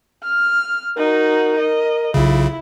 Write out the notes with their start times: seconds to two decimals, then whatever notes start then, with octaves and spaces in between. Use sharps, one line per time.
0.24 F6
0.98 D#4 F#4 A#4
1.59 D#5
2.14 B1 C#3 E4 F4